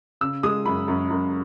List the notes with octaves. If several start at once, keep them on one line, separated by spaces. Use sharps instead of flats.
C#3 E6
G#3 D#6
F#2 B5
F#2
F#2